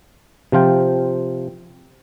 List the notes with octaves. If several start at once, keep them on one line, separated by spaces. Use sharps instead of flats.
C3 F3 F4 G5